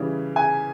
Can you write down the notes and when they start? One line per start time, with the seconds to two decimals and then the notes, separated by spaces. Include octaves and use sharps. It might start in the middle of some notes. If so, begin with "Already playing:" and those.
Already playing: C#3 E3 G3
0.36 G#5